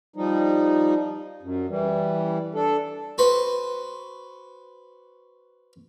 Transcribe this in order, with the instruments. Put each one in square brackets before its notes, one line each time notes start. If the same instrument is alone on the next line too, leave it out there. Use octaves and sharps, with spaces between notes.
[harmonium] F3 G3 D#4
F#2
E3 G3
D4 A4
[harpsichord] F#4 B4 C5